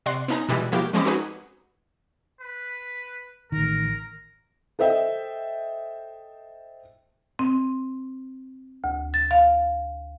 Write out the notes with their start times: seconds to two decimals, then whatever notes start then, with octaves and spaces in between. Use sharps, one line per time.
0.06 C3 D5 F#5 C6
0.28 B3 C#4 D#4 G#5 A#5
0.49 B2 E3 G3 G#3
0.72 F3 G#3 A#3 E4 F#4 G4
0.93 F3 G#3 C4 C#4 B5 D6
1.05 D#4 F#4 G#4 B4
2.41 B4
3.52 A1 D#3 A#4
4.79 A4 C5 D#5 E5 G5
7.39 C4
8.84 D2
9.14 A6
9.31 F5